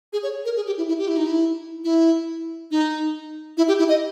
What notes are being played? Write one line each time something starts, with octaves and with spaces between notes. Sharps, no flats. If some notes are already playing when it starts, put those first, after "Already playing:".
G#4
C#5
A#4
G#4
G4
E4
E4
G4
E4
D#4
E4
E4
D#4
E4
G4
E4
D#5